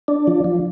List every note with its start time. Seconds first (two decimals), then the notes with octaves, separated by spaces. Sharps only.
0.08 D4
0.27 F3
0.44 F3